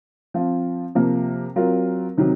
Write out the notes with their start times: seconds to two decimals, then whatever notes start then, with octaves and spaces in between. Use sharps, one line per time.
0.34 F3 C4 F4
0.95 C3 F3 A#3
1.56 F#3 C4 F4 A#4
2.17 C3 D#3 F#3